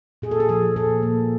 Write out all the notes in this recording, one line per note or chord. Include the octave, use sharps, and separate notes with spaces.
A#2 G#4
A4
G#4
F3 A4
A#2 A4
A#3